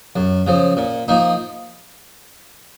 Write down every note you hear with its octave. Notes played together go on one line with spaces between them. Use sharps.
F#2
C#3 F3
A#2
F3 A#3 D#4